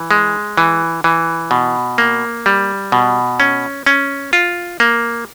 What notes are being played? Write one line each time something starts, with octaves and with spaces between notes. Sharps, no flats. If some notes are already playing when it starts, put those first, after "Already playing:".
Already playing: E3
G#3
E3
E3
B2
A#3
G3
B2
C#4
C#4
F4
A#3